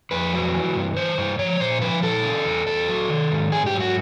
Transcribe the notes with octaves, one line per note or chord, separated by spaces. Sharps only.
F2 B4
F#3
E3
G2
E3 C5
G2
F3 C#5
A#2 C5
F3 B4
A#2 A4
C#3
E2
E2 A4
F#3
D#3
G#2
G#2 G#4
G4
F#3
F#4